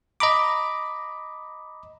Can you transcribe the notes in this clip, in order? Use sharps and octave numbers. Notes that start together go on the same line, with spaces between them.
D#5 A#5 B5 D6